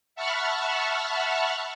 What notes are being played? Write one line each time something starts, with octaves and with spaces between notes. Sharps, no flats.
E5 F#5 A5 B5 C#6 F6